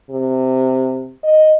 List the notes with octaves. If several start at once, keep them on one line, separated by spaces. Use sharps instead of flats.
C3
D#5